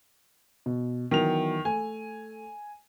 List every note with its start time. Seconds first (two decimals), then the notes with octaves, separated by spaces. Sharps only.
0.66 B2
1.11 D#3 E3 F#3 B3 F7
1.65 A3 A4 G#5